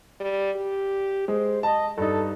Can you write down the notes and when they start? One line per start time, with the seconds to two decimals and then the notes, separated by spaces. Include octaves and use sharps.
0.20 G3
0.56 G4
1.28 G#3 C5
1.63 D#5 A5
1.98 G2 D#4 A4